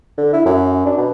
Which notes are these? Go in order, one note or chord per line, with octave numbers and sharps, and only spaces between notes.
D3
E4
F#2
D4
B2